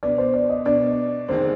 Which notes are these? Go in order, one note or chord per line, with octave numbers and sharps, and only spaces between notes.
B2 B3 D4 D5
C5
D5
D#5
B2 B3 D4 D5
F1 F2 D#3 G#3 C4 C5